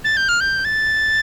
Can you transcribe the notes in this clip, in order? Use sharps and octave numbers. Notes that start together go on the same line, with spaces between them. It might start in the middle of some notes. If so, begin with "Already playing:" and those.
A6
G6
F6
G6
A6